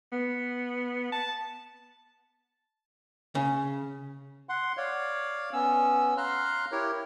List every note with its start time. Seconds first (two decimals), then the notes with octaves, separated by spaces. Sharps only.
0.12 B3
1.12 A5
3.35 C#3
4.49 F#5 C6
4.77 C#5 D5 F5
5.53 B3 C#4 E6
6.17 F5 A#5 C6 F6 F#6
6.72 E4 G4 A#4 C#5